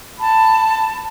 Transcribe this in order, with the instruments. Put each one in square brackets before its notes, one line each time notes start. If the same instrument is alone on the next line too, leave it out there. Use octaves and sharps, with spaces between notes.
[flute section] A5 B5